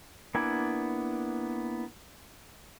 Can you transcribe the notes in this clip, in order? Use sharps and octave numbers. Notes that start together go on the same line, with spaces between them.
A#3 B3 D4 E4 G#5